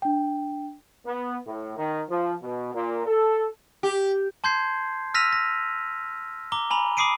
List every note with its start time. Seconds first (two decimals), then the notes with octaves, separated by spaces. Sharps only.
0.02 D4 G5
1.06 B3
1.47 A2
1.77 D#3
2.10 F3
2.42 B2
2.74 A#2
3.07 A4
3.83 G4
4.44 A5 C6 G6 G#6 C7
5.14 E6 F6 A#6 B6 D#7 F7
5.33 A#6
6.52 A#5 D6 G7
6.70 G#5 A#5 B5 F7
6.97 B5 D6 D#6 C7 D7 D#7